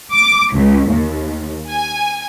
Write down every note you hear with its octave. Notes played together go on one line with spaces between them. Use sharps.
D6
C#2
D#2
G#5